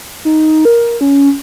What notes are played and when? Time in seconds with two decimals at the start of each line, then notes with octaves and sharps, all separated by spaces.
0.25 D#4
0.65 A#4
1.01 C#4